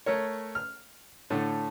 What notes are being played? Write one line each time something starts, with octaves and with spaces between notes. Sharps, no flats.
A3 A4 A#4 C#5
F6
A2 D3 A3